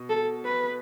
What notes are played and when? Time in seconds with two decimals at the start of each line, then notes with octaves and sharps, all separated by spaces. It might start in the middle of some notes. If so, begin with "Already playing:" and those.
Already playing: B2
0.10 A4
0.45 B4